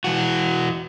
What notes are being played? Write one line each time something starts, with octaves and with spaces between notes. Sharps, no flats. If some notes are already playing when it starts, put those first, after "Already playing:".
E3 F#4